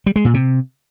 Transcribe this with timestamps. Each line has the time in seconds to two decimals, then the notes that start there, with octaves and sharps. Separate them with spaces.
0.06 G3
0.16 G#3
0.25 A#2
0.34 C3